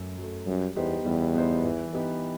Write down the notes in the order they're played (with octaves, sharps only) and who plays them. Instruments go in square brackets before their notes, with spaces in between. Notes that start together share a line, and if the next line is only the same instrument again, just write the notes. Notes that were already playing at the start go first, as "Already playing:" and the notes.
Already playing: [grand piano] F#2 F#3 A3
F#3 A3
[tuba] F#2 [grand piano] G3
[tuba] E2 [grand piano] B3 D#4 G4 C5
[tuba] E2 [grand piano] G3
[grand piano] B3 D#4 G4 C5
E3
B3 D#4 G4 B4